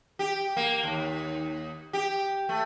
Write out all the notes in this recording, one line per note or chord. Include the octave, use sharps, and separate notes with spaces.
G4
A#3
D#2
G4
A3